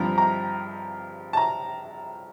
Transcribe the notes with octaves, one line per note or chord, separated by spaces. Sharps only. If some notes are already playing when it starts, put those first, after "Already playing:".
Already playing: G2 F3 C4 A#5
A#5
A5
A#5